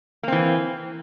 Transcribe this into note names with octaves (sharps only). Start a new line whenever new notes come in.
E3 A#3 C4